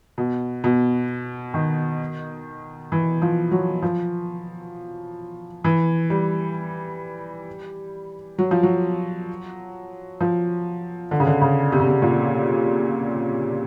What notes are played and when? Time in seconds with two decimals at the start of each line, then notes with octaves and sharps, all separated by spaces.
0.18 B2
0.64 B2
1.54 D#3
2.92 E3
3.22 F3
3.51 F#3
3.82 F3
5.64 E3
6.10 G3
8.39 F#3
8.51 F3
8.63 F#3
10.21 F3
11.11 D3
11.20 C#3
11.27 D3
11.41 C#3
11.72 C3
11.80 C#3
11.87 C3
12.02 A#2